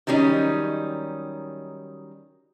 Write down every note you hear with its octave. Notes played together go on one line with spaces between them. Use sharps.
D#3 F#3 G3 C#4 D#4